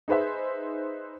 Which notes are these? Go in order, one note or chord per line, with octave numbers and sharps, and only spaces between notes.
D#4 G#4 B4 C5 E5